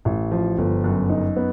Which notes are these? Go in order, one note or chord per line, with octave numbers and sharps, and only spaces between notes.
A1
F3
G1
F#2
D#4
B3